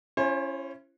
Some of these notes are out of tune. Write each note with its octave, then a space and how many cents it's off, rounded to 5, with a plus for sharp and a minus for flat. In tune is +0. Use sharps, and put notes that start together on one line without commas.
C#4 +0 E4 +40 C5 +40